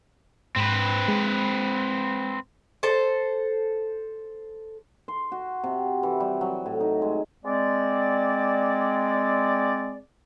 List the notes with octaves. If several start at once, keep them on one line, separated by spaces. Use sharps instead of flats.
G#2 C4 B4
G#3
A4 C5
C6
F#4
C3
E3
G3
F#3
A2
D#4
G#3
G#3 C4 D5